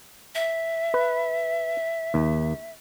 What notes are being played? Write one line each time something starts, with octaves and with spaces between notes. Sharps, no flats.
E5
B4
D#2